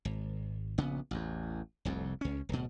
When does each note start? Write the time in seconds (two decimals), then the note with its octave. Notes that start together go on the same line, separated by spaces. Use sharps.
0.05 G#1
0.78 A#1 C#3 B3
1.11 A1 E2
1.85 F1 C2 F2
2.21 C#2 C#4
2.49 D1 B2